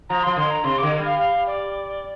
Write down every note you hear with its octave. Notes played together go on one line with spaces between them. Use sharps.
F3 A#5
F3 C6
D3 C6
A#5
C3 C6
D3 D6
G3
F5
F5
D5